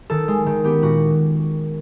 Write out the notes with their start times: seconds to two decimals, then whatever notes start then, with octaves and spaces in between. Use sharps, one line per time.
0.10 D#3 A4
0.28 G#3
0.46 D#3
0.64 B3 G4
0.83 A#2 F#4